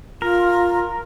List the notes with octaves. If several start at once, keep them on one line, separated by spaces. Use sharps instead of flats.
F4 A#4